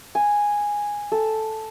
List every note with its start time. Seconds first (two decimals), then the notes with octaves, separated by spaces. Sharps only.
0.15 G#5
1.12 A4